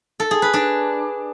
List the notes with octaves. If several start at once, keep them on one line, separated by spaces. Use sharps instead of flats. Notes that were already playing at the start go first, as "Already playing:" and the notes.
A4
G#4
B4
D4